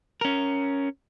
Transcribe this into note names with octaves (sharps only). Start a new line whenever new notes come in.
C#4 A#4